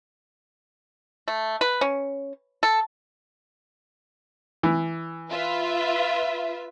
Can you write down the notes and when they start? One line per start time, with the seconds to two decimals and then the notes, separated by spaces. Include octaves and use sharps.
1.28 A3
1.61 B4
1.81 C#4
2.63 A4
4.63 E3
5.31 F4 B4 E5